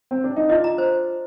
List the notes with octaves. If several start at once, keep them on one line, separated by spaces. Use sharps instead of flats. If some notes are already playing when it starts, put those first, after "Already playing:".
C4
D4
D#4
D4 F4 D#5
A#5
C5